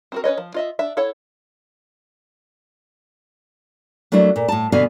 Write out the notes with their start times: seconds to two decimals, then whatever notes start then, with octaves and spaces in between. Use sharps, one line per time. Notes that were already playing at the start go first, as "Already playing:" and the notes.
0.12 C4 F#4 A#4
0.24 C#4 B4 C#5 D#5
0.38 F3
0.54 F4 D#5 E5
0.79 D4 E5
0.97 E4 A4 C#5 F#5
4.12 F#3 A3 A#3 D4 E4
4.36 A#2
4.48 A2 A5
4.72 B2 D3 B3 D5 F5 G#5